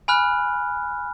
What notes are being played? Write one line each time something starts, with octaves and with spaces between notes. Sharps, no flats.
G#5 B5 F6 F#6